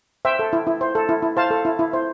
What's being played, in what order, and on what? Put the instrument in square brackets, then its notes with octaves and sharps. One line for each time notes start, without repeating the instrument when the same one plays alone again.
[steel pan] C5 E5 G5
A4
E4
E4
C5
A4
E4
E4
C5 F5 A5
A4
E4
E4
C5